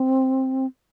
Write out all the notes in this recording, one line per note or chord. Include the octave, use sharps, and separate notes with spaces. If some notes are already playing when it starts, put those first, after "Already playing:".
Already playing: C4